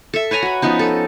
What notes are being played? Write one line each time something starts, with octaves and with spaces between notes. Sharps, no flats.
A4 E5
B4 C#5 G#5 A#5
F#4 B5
F3 B3 C#4 D#4
A4